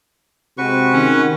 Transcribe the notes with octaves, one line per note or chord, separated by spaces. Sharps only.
C3 G#3 C4 F#4 B4 C#6
D#3 C#4